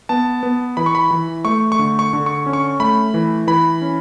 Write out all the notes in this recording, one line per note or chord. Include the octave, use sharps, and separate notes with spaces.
B3 A5
B3
E3 B5
C#6
B5
E3
A3 C#6
C#6
D3
C#6
D3
C#6
C#4
C#6
A3 B5
E3
E3 B5
C#4